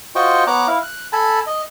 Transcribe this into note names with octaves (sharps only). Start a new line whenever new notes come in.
F4 F#4 C5 D#5 G5 C#6
B3 C#5 A#5 D6 F#6
E4 F5
F#6
A4 G#5 A5 B5
D#5